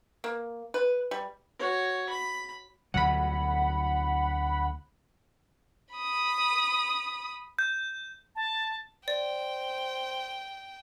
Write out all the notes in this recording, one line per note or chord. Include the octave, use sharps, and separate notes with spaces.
A#3
B4
G3
F#4 C#5
B5
D2 B2 F#3 F#5 B5
B5 D#6
G6
A5
C5 D5 G5